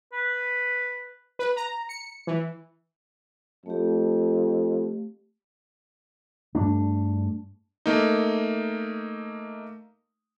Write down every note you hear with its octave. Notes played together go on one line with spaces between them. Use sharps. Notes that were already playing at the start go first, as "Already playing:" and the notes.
B4
B4
A#5
C#7
E3
F2 A3 G4
G2 A3 D4
A3 A#3 D#4